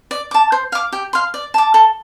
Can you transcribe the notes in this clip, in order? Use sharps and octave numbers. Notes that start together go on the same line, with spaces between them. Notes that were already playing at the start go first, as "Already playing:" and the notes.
D5
A5 D6
C5
F5 D6
G4
F5 C6
D5
A5 D6
A4